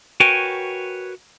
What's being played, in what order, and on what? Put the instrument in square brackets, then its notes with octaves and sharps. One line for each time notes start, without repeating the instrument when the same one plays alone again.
[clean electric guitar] F#4 A#4 B4 C#5 G5 G#5